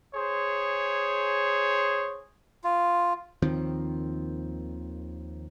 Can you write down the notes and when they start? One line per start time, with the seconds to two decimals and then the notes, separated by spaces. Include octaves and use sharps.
0.15 G#4 C5 C#5
2.64 F4
3.42 D#2 D#3 F3 C4